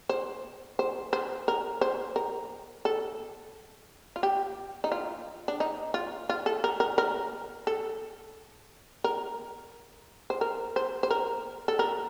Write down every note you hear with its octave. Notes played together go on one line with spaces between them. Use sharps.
C5
C5
C5
A#4
C5
A#4
A4
F4
G4
D#4
F4
D4
D#4
F4
F4
A4
A#4
A#4
A#4
A4
A#4
C5
A#4
C5
C5
A#4
A4
A#4